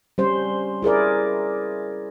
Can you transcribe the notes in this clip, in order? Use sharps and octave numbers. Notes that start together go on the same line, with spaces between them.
G3 C#4 C5
E4 G#4 A#4 D5